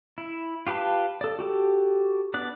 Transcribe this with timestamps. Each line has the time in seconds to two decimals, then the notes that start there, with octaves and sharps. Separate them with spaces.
0.18 E4
0.67 F4 G4 B4 F5 A5
1.21 A4 D5
1.39 F#4 G4 A4
2.34 B3 D4 D5 F#6